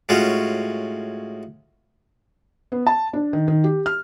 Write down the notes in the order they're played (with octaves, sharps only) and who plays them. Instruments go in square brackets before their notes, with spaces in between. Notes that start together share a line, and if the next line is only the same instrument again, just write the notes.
[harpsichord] A2 G#3 C#4 F4 F#4
[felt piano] B3
A5
D4
D#3
D#3
G4
F6